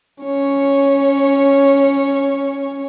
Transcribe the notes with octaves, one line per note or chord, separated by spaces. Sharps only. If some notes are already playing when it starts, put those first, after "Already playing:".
C#4 C#5